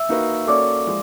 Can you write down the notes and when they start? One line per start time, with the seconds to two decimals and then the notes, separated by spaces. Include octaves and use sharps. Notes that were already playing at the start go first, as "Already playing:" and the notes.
Already playing: E5 E6
0.09 A#3 D#4 F#4 B4
0.47 A#3 C#4 F#4 A4 D5 D6
0.87 F3 G#3